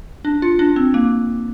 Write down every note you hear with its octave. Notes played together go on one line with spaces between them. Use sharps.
D4
F4
D4
C4
A#3